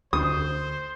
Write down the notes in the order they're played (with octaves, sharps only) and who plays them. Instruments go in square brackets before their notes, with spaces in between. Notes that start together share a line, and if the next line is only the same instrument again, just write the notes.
[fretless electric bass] D2 [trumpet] C5 [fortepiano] D#6